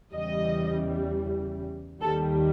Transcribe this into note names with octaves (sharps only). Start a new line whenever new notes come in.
E2 C#3 E3 G3 D#5
D#2 D#3 G3 A4